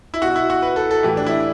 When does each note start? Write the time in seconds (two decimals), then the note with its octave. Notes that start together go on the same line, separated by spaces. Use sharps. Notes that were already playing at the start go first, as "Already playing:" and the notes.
0.14 E4
0.22 B2 F#4
0.36 E4
0.50 F#4
0.62 B4
0.76 A4
0.91 A4
1.03 A2 E3 G4
1.17 D4
1.26 E4
1.31 D4